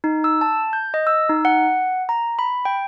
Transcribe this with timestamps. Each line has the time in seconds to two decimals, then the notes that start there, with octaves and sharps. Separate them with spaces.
0.04 D#4
0.24 E6
0.41 A5
0.73 G6
0.94 D#5
1.07 E6
1.29 D#4
1.45 F#5
2.09 A#5
2.39 B5
2.65 G5